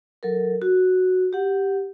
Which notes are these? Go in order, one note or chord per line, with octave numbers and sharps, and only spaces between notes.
F#3 A4 A#4
F#4
G4 F#5